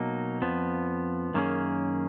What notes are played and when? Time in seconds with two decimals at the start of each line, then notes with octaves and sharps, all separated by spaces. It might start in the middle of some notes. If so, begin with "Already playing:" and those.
Already playing: B2 F#3 A#3 D#4
0.42 F2 F3 B3
1.34 F#2 D#3 A#3 C#4 G#4